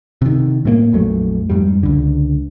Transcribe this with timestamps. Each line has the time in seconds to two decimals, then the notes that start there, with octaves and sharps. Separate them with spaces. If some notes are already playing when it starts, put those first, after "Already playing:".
0.22 C3 D#3
0.65 A2 G#3 A#3
0.92 A#1 F2 F#3 A3
1.50 F2 G#2 G3
1.83 C#2 D3